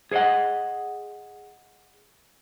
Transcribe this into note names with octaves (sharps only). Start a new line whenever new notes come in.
G#4 C5 C#5 D#5 F#5